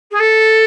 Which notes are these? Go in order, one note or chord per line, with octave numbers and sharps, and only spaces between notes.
G#4
A4